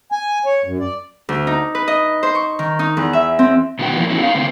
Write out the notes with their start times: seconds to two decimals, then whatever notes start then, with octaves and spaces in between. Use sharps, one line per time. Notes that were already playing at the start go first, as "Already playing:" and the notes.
0.12 G#5
0.46 C#5
0.65 F#2
0.80 D5
1.29 D2
1.47 D#4
1.75 B4
1.88 D#5
2.23 C5
2.35 C#6
2.59 D#3
2.79 D#4
2.97 E2
3.13 E5
3.39 C4
3.79 B2 D#3 B3 F#4 G5
3.96 E3 F3 A#3 E4
4.10 A3 B3 C#4 D#4 E4 F#4
4.23 D#4 C#5 F5
4.35 A2 D3 B3 C4